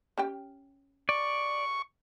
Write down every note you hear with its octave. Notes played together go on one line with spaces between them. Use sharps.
C#4 G4 G5
D5 C#6